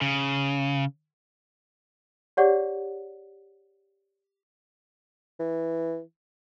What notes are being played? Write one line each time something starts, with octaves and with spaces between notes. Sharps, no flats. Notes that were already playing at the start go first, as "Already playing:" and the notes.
C#3
G4 G#4 C#5 D5 F#5
E3